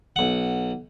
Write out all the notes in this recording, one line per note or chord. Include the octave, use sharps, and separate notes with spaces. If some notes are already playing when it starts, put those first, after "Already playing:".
B1 F#5